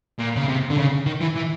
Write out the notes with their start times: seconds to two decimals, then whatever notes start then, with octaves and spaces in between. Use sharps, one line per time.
0.19 A#2
0.36 C#3
0.48 C3
0.70 D3
0.77 C#3
1.06 D#3
1.21 E3
1.35 E3